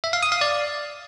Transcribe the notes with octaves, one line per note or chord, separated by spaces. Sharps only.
E5
F5
D#6
F5
D5